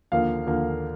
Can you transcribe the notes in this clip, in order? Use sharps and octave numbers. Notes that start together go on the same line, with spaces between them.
D#2 D3 F3 A#3 F5
D#2 D3 F3 A#3